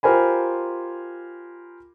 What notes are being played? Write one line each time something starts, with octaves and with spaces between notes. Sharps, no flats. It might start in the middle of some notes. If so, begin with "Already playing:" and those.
F4 G4 A#4 C5 G#5 B5